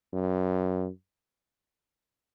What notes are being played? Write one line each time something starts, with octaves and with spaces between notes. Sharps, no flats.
F#2